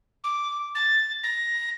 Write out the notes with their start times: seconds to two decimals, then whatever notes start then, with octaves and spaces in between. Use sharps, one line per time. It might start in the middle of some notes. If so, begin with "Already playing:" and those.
0.24 D6
0.75 A6
1.23 A#6